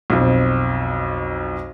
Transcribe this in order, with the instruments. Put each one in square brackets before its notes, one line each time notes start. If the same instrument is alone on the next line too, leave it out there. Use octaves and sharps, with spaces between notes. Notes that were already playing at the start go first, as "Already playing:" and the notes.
[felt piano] B1 F2